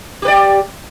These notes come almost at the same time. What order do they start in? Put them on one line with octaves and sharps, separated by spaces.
G4 B4 D5